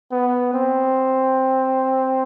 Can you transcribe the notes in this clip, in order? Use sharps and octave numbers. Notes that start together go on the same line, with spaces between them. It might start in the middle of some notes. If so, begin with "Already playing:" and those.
B3
C4